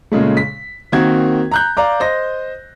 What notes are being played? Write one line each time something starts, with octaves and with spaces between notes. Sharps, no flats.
A#2 C#3 G#3 A3
B6
D#3 A#3 C4 F#4 G#6
A#5 F#6 G6
D5 F5 A#5 D6
C5 D#5 A#6